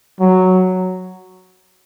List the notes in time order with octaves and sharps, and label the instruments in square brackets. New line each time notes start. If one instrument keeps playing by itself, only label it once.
[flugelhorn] F#3